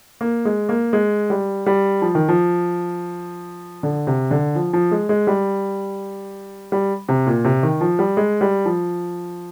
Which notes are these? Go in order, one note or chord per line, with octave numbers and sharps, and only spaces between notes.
A#3
G#3
A#3
G#3
G3
G3
F3
D#3
F3
D3
C3
D3
F3
F3
G#3
G#3
G3
G3
C3
A#2
C3
D#3
F3
G3
G#3
G3
F3